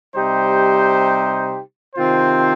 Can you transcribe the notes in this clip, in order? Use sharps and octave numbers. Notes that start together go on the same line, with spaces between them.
C3 G3 D#4 G4 C5
C3 D#3 C4 F4 C5